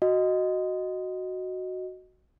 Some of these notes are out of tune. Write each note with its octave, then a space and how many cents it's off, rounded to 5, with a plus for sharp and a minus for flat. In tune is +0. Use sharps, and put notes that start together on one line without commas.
F#4 +0 D#5 +0